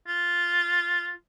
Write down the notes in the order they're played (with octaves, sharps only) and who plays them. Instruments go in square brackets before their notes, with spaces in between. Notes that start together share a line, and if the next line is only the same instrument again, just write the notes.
[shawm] F4